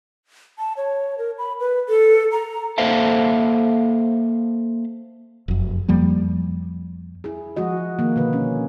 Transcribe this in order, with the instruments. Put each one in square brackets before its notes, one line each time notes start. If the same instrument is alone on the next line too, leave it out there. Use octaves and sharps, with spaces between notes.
[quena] A5
C#5
A#4
B5
B4
A4
A#5
[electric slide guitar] A#3 A4 C5 E5 F5 A5
[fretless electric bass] F1 F#2
F2 F3 G3 A#3
[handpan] E4 G#4
F3 G#3 F#4 D#5
D#3 A#3
B2 D3 B4
C#4